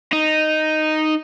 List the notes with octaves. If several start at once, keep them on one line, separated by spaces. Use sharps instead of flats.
D#4